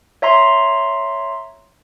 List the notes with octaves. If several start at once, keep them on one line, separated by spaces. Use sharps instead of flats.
C#5 E5 A#5 C6